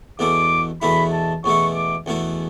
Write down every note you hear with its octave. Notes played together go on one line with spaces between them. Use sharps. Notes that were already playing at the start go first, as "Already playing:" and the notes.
E2 B2 A3 E4 D6
E2 B2 A3 E4 B5
A5
E2 B2 A3 E4 C#6
D6
E2 B2 A3 E4